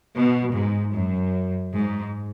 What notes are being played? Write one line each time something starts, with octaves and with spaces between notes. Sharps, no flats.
B2
G#2
F#2
G#2